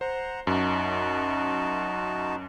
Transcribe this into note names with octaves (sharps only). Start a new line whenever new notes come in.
C5 F#5 A#5
F#2 D#4 F#4 A5